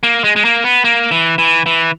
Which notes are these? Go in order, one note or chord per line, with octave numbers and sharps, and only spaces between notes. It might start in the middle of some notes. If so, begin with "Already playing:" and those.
A#3
G#3
G#3
A#3
B3
A#3
E3
E3
E3